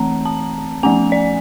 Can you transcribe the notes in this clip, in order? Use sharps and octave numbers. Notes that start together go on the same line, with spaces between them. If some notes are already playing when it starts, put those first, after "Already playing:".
Already playing: E3 A3 C4 A#5
A5
F3 A3 C#4 G#5
D5